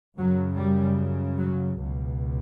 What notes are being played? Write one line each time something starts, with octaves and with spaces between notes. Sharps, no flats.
F#2 C#3 F#3
G3
F#3
C#2 B2